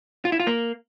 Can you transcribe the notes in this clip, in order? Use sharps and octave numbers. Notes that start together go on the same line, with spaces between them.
F4
E4
F4
A#3